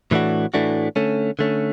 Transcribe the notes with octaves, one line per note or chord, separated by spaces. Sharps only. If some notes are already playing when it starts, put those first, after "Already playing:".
A2 E3 A3 D4 F#4
A2 E3 A3 D4 F#4
D3 A3 C#4
D3 A3 C#4